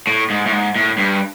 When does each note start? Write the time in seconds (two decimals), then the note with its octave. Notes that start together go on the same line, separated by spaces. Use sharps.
0.07 A2
0.30 G#2
0.46 A2
0.52 G#2
0.76 A2
0.98 G2